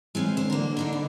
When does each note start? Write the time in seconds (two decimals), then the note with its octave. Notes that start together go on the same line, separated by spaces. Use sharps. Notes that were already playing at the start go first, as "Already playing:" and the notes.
0.15 E3 G#3 C4 C#4
0.37 D3 C5
0.50 A#3 A#4
0.77 D4 D#4 C5
0.93 B3